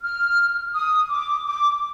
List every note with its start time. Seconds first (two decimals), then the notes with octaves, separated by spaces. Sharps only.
0.03 F6
0.74 D#6
1.09 D6
1.45 D6